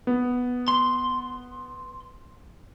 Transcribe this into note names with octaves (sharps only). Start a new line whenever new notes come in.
B3
C6